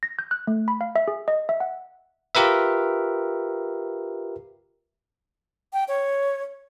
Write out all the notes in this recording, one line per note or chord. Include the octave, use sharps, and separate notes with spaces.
A#6
G6
F#6
A3
B5
F5
E5
G#4
D#5
E5
F#5
F4 G4 A#4 B4 E5
G5
C#5